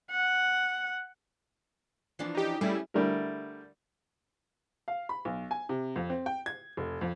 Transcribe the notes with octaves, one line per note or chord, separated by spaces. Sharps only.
F#5
E3 F3 D4
D#4 G4
G3 A3 C#4 E4 G#4
D3 G3 A3 E4 A#4
F5
B5
B1
G#5
C3
F2
C4
G5
G#6
F1
F2